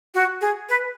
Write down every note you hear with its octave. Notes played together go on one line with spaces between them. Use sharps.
F#4
G#4
B4